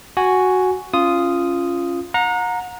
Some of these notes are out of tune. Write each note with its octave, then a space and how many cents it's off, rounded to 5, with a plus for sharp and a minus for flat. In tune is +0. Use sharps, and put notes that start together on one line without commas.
F#4 +0 G#5 +0
C#4 +0 F4 -10 D#6 +0
F#5 -35 A#5 +0